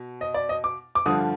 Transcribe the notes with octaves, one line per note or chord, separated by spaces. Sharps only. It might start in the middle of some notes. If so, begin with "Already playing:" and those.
Already playing: B2
D#5
D5
D#5
D6
D6
G2 D3 F3 D#6